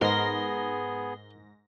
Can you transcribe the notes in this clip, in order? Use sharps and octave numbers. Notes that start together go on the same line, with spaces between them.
G#2 B3 G#4 A#4 C6 A#6